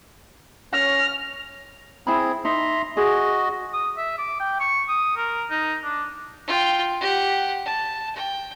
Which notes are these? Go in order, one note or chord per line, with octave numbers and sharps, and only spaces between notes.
C#4 F6 A#6
C4 E4 G#4 C5 B5
D#4 E5 A#5 C6
F#4 G#4 D#5
D#6
E5
D6
G5
C#6
D#6
A#4
D#4
D4
F4 G5
G4 F#5
A5
G5